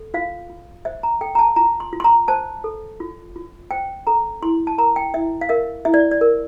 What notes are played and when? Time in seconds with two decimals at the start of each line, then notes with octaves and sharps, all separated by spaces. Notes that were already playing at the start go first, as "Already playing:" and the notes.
Already playing: A4
0.14 F4 F5
0.50 F4
0.85 C5 E5
1.03 A#5
1.21 A4 G5
1.35 A#5
1.39 A5
1.56 F4 A#5
1.80 C6
1.93 F4
2.00 C6
2.04 A#5
2.28 C5 A5
2.64 A4
3.00 F4
3.36 F4
3.71 C5 G5
4.07 A4 A#5
4.42 E4 C6
4.67 A5
4.78 A#4 A#5
4.96 G5
5.14 E4 E5
5.41 F5
5.49 A#4 E5
5.85 E4 E5
5.94 D5
6.11 D5
6.21 A#4